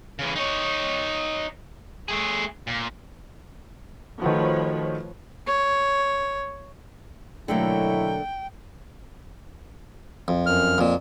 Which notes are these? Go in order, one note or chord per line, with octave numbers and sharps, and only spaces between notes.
C#3 E3
D#4 C#5
A3 G#4
A#2
D#3 F3 A3 F#4 B4 C#5
C#5
B2 D3 D#3 F#3 A3 A#3 E4 G5
F2
F#2 F6
F2 A#2